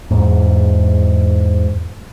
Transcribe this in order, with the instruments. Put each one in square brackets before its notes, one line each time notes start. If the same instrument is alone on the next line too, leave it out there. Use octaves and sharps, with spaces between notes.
[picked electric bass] E2 G#2